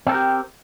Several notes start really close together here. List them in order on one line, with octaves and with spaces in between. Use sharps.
C4 A4 A#4 G4